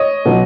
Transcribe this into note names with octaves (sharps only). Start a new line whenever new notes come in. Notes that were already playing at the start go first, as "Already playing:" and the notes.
Already playing: C#5 D#5
B2 F#3